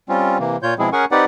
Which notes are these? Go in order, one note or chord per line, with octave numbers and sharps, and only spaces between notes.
G3 C4 C#4 F4
C3 E3 A#3
A#2 F4 C#5 G6
B2 F3 G#3 C4 E4 G#4
C#4 G#4 A#4 F#5 G#5 C#6
C4 D#4 G4 B4 D5 F#5